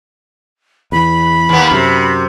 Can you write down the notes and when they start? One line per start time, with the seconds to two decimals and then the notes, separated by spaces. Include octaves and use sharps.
0.92 E2 B5
1.49 D#2 A#3 B3
1.71 F#2 C3